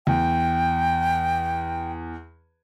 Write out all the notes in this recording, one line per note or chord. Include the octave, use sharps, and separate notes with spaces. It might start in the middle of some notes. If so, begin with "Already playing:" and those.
E2 G5